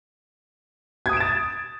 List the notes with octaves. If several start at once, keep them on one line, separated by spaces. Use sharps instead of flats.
D#6 G#6 A6 D7 E7